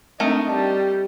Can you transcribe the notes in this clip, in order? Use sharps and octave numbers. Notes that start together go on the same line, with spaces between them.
A3 C4 D4 D#4 A#4
G3 A5